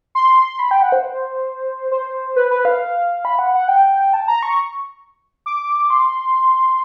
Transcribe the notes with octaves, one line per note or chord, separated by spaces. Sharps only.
C6
B5
G5
F#5
C5
C5
B4
B4
F5
B5
F#5
F#5
G5
A5
A#5
C#6
D6
C6